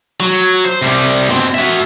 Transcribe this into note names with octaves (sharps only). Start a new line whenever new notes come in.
F#3
C5
C3 G3
B2 C4
F#4 E5